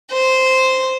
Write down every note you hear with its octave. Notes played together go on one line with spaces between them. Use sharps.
C5